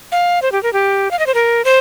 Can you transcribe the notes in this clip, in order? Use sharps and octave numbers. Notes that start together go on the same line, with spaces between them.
F5
C5
G4
A#4
G4
F5
D#5
C5
A#4
C5